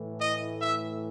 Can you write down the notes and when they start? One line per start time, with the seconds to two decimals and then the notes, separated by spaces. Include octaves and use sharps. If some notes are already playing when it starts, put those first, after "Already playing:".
Already playing: A2 E3 A3
0.20 D#5
0.59 E5